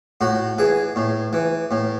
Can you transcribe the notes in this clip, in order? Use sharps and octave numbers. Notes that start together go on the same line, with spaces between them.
A2 F#4
E3 G#4
A2
E3
A2